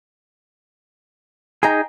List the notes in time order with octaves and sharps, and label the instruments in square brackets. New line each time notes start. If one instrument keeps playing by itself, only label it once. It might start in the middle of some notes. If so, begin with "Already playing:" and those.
[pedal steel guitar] D#4 G#4 [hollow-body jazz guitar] G5 G#5 A#5